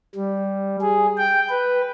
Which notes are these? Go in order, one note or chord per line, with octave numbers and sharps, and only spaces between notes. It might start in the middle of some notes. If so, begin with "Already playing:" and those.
G3
G#4
G5
B4